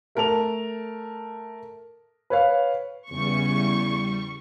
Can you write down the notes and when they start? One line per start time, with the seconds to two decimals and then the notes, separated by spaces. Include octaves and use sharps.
0.15 A3 A#4 A5 F7
2.30 B4 C#5 F5
3.12 E2 C#3 G3 C#6